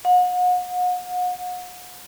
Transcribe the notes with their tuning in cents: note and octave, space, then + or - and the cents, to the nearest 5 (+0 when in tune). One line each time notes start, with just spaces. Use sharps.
F#5 -40